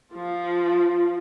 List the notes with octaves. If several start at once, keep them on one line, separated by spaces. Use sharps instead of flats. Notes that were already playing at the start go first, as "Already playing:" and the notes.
F3 F4